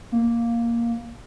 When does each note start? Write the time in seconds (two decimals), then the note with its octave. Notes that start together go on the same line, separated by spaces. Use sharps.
0.12 A#3